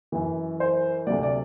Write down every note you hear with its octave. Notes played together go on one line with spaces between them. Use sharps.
F#2 E3
C5
D2 C3 F#3 D5
D5